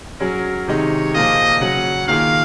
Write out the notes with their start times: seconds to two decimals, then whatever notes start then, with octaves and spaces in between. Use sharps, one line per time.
0.20 F#3 C#4 G#4 A#4
0.67 C3 D#3 G#3 D#4 C#5
1.14 A#2 F3 A#3 F4 G#4 D#5
1.60 C#3 F#3 C#4 F#5
2.08 D#3 A#3 F4 G#4 F5